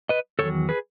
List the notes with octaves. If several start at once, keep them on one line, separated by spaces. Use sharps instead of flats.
B4 D#5
E2 D#3 F#3 A4 C#5
G#4 B4